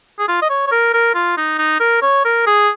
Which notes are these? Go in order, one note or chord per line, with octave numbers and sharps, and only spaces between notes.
G#4
F4
D#5
C#5
C#5
A#4
A#4
F4
D#4
D#4
A#4
C#5
A#4
G#4